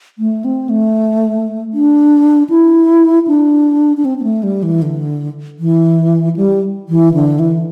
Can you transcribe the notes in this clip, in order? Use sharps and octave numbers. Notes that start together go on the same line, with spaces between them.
A3
C4
A3
D4
E4
D4
D4
C4
C4
A3
G3
E3
D3
E3
G3
E3
D3
E3